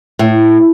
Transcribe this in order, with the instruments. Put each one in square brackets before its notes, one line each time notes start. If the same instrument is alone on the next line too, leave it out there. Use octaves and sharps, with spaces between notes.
[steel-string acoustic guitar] A2